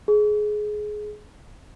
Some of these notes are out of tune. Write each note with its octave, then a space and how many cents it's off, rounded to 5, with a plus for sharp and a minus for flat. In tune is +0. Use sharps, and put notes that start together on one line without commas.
G#4 +20